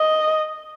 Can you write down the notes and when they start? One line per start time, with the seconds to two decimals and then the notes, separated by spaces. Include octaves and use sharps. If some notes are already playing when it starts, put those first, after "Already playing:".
Already playing: D#5